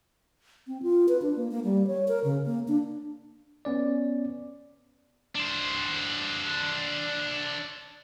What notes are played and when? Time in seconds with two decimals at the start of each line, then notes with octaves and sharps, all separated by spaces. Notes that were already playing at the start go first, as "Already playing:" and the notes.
0.67 C4
0.83 F4
1.09 B4
1.22 D4
1.36 A#3
1.51 A#3
1.64 G3
1.87 C#5
2.08 A#4
2.24 C#3
2.46 A#3
2.68 D4
3.65 B3 C#4 D5
5.35 D4 C5